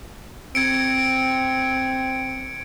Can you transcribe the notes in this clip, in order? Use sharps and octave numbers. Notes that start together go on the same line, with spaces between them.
C4 G#6 C#7 D7